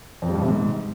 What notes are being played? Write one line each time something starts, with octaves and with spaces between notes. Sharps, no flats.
F2
G3
G2
C3
G#2